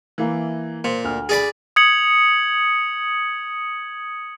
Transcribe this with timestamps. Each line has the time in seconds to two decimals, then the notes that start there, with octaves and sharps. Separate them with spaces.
0.18 E3 A#3
0.84 A#2 C5
1.04 D2 F6
1.29 G#4 D5 B5
1.76 D#6 G#6 C#7 F#7